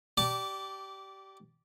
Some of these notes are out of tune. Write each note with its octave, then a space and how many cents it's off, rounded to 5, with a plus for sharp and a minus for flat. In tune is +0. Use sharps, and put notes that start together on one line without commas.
G4 -20 D5 +0 A5 +0